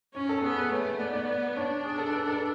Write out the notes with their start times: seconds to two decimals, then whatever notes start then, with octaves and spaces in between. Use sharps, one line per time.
0.14 C#4 C#5
0.29 A4
0.43 B3 G#4
0.57 B4
0.71 A3 C#5
0.99 B3 D5
1.13 D5
1.56 D4 C#5
1.84 G#4
1.98 A4
2.12 B4
2.27 A4